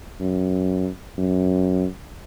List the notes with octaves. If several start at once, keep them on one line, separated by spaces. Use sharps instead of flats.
F#2
F#2